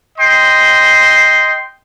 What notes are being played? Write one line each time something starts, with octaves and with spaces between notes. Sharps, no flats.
D#5 G5 C6